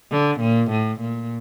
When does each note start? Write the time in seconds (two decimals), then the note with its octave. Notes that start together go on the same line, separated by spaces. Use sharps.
0.11 D3
0.41 A#2
0.71 A2
1.01 A#2